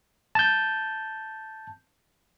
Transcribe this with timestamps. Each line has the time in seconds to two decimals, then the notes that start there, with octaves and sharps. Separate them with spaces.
0.35 A5 G6